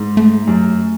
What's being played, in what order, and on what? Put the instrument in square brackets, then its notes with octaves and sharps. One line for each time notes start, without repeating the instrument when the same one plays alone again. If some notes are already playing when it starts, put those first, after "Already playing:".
Already playing: [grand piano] G#2
[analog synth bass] A3
[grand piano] F#2